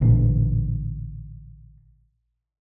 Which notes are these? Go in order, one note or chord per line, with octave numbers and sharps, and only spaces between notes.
A1 A#2 D3